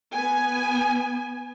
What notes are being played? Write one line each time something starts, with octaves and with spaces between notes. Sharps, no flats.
B3 G#5